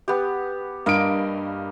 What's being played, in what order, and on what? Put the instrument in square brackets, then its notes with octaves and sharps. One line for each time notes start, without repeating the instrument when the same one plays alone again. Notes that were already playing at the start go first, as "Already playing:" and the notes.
[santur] B3 G4
[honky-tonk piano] G2 D7 [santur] A#3 D#5